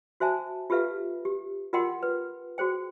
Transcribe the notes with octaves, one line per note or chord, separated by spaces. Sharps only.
F#4 C5 E5 G#5 A5
F4 G4 A4 B4 E5 F5
G4
F4 A#4 D#5 F#5 G5 C6
B4
F#4 G#4 C5 G5